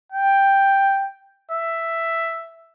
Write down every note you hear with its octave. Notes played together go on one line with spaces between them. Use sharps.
G5
E5